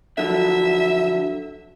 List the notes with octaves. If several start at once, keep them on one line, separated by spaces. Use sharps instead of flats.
D3 F3 F#3 E5